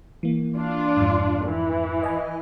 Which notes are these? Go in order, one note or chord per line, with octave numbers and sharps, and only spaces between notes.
E3 A#3
D4 F4
F2 G#2
E3
D#5 G#5